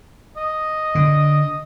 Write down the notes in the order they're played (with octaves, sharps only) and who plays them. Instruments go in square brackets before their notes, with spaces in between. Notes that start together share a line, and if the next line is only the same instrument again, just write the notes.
[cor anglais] D#5
[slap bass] D3